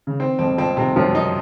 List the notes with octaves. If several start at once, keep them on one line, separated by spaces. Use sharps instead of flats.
C#3
D#3 C4
F2 F3 C4
F2 F3 C4
C3 D#3
F#2 F3 F#3
D#4